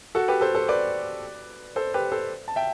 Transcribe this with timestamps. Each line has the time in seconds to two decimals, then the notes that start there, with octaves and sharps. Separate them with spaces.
0.15 F#4 A4
0.28 G4 B4
0.41 A4 C5
0.55 A4 C5
0.68 B4 D5
1.76 A4 C5
1.94 G4 B4
2.12 A4 C5
2.48 A5
2.56 E5 G5